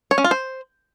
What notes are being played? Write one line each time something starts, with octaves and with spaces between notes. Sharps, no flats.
C#5
C#4
F4
C5